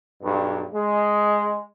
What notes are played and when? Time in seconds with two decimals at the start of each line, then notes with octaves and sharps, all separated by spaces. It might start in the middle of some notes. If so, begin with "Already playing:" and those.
0.23 B1 G2
0.74 G#3